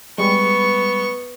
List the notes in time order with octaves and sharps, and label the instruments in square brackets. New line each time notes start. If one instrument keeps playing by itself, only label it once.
[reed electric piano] G3 G#3 [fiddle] B3 C#6